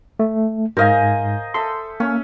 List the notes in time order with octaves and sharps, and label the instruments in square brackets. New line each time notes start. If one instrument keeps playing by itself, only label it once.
[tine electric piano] A3
[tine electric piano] G#2 [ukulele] A#4 F5 [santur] C5 D#5 G#5
[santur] A4 E5 [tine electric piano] C6
[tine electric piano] A#3 [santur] C#4